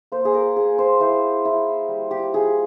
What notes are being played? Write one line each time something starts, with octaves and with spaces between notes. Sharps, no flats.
A#3 C5
G#4
A#4
A#3 G#4
C5
E4 C5
E4
G3
G4
F4 G#4